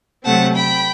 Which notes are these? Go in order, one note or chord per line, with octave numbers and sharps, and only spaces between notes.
C3 F#3 A3 C4 F#5 A5
G5 B5